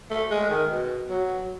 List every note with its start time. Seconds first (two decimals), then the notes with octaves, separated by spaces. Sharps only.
0.10 A3
0.31 G#3
0.50 D#3
0.70 B2
1.09 F#3